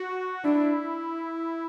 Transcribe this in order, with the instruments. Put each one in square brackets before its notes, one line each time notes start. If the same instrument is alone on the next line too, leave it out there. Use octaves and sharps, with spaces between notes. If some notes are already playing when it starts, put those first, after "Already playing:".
Already playing: [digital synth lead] F#4
[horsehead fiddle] D4 [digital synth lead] E4